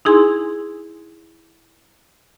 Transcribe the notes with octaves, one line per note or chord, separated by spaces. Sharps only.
D#4 E4 G#4 G#5 C6